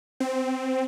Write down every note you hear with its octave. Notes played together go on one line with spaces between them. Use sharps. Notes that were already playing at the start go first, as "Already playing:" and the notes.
C4